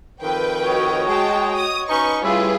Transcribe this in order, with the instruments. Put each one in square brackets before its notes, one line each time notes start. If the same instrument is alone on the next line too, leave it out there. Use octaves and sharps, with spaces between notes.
[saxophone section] F2 D#3 [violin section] B4 G5
[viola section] F#4 C#5 D#5
[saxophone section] G#3 [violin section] G5 A5
[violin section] D#6
[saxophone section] C#4 D#4 [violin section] B4 C#6
[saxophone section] A2 C#4 E4 [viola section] G3 [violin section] F4 G#4 B4